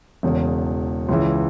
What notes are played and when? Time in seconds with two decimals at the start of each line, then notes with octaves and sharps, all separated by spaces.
0.23 E1 E2 C#3
1.09 C#2 C#3 E3